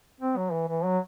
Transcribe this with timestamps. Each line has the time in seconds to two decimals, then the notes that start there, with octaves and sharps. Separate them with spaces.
0.21 C4
0.37 F#3
0.52 E3
0.68 E3
0.85 F#3